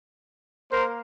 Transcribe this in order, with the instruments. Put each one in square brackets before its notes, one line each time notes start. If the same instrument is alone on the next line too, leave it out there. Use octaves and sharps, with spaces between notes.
[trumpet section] A#3 A#4 C5